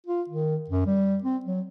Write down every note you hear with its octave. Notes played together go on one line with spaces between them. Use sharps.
F4
D#3
F#2
G3
C4
F#3